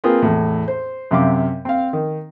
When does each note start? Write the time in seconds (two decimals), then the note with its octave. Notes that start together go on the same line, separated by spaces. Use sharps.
0.04 A#3 C4 F4 G#4 B4
0.22 E2 A2
0.68 C5
1.11 F#2 C3 F5 D6
1.65 C4 F5
1.93 D#3